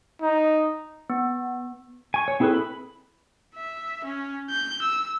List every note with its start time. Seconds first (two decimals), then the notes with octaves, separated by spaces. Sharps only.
0.22 D#4
1.10 B3
2.14 G#5 C#6
2.28 C#5
2.40 C4 E4 G#4 A4 B4
2.54 B5
3.55 E5
4.05 C#4
4.50 G6
4.83 E6